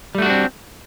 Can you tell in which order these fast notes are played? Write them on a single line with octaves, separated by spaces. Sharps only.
G3 A3 F#4 D4 C4